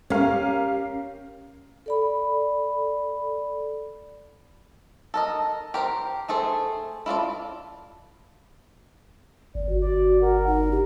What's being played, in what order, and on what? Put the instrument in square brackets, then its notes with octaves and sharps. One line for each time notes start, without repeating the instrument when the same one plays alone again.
[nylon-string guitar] C#4 [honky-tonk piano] G4 A#4 F5
[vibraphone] A4 D5 B5
[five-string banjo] A4 A#4 D#5
G4 A#4 C5 G5
A3 G#4 A4 C5
E4 F4 A4 D5
[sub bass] G1 [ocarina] D5
[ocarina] F#4
[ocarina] F#4 [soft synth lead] D5
[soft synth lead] A#4 [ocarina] F#5
[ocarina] D#4
G4